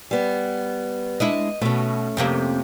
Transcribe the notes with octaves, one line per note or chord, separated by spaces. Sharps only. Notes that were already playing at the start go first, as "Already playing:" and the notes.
G3 B3
G#3 D4 E4 D#5
B2 A3 C#4
F2 C3 A#3